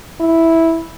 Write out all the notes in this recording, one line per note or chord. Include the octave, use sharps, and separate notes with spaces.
E4